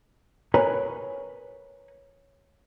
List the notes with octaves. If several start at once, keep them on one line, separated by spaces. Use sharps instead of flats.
A#4 B4 C#5 G#5 A#5